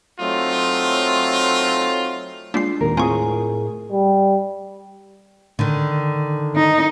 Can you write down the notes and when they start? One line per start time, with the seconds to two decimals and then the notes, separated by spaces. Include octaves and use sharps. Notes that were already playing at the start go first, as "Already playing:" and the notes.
0.20 F#3 A3 C4 D#4 F4
2.54 G#3 A#3 D4 F4 C7
2.81 D#2 A#2 D#3 A#4
2.97 A2 C4 F4 G#4 G#5 C#6
3.91 G3
5.59 D3 D#3
6.56 D#4